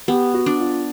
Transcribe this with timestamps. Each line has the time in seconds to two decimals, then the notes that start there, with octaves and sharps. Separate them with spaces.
0.08 B3 G4
0.34 F#4
0.46 D4
0.60 F4